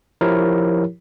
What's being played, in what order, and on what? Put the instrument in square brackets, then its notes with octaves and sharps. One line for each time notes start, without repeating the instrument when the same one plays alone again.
[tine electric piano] F3 E4 G4 A#4 C#5